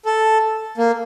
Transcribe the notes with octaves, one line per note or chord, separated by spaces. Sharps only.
A4
A#3